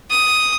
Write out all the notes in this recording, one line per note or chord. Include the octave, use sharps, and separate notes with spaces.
D#6